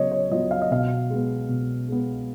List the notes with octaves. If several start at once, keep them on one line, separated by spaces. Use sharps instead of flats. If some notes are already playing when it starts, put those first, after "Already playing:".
Already playing: C#3 F#3 B3 C#5 D#5
C#5
F#3 B3 F4 D#5
F5
D#5
B2 F5
G#3 B3
B2
G#3 B3